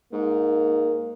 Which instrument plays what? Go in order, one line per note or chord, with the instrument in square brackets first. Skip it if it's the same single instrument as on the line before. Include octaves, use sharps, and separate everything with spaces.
[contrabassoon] G#2 [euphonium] A#3